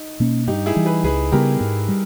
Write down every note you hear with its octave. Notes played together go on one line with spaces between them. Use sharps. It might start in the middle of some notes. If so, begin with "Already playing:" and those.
Already playing: D#4
B2 A#3 C#4
G2 D#4 G4
E4 G#4
E3 G3
G#4 B4
C#2 G#4 B4
C#3 G3 B3 G4 A#4
G#2
G3